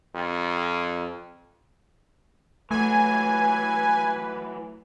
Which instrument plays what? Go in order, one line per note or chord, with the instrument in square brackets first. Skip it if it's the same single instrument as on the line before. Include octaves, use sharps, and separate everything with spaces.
[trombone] F2
[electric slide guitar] E3 F#3 [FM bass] A3 [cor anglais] B4 [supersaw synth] G#5